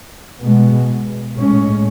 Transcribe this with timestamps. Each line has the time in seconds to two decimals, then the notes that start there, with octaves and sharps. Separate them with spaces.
0.41 B2 G#3 B3
1.36 A2 G#3 C#4